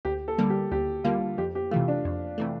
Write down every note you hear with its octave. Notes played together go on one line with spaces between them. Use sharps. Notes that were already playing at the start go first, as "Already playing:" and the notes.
D2 G4
A4
D3 G3 A#3
G4
D2 G4
D3 G3 A#3 F4
F2 G4
G4
C3 E3 A3 F4
D4
F2
C3 E3 A3